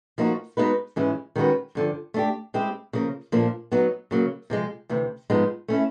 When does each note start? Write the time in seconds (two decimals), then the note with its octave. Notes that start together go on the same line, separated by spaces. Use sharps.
0.18 F3 A#3 D#4 F#4
0.57 G#3 B3 D#4 F#4 B4
0.96 G#2 E3 G#3 C#4 E4
1.36 D#3 G#3 C#4 F#4 B4
1.75 G2 D3 F3
2.14 A3 D4 G4
2.54 G#3 C4 E4 G4
2.93 C#3 F3 A#3
3.32 A#2 F3 A#3 D4
3.71 F#3 B3 D#4
4.11 C#3 F#3 A#3
4.50 C3 F3 G#3
4.89 D2 C3 E3
5.30 G#2 F3 G#3 B3 D#4
5.68 A3 C#4 E4